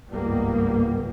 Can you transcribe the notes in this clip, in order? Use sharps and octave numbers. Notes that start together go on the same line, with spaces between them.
G1 C#2 G#2 G3 A#3 B3